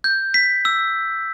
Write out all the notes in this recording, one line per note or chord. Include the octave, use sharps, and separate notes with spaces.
G6
B6
E6